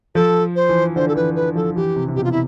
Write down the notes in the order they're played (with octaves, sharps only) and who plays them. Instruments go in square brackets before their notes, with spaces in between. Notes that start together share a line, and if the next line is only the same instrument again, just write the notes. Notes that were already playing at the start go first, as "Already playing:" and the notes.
[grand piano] F3 [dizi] A4
[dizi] C5
[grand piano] E3
[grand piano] D3 [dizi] C5
[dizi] A4
[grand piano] E3 [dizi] B4
[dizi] B4
[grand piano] F3 [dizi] A4
[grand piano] E3 [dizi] G4
[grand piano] C3
C3
[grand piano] B2 [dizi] G4
[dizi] F4
E4